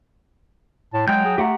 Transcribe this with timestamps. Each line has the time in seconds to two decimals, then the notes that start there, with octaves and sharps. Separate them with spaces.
0.94 A2 A5
1.08 F#3 G#3 G5 G6
1.25 G#4
1.38 A3 G4 F#5 A#5